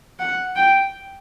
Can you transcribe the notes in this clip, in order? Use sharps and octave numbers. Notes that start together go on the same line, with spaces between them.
F#5
G5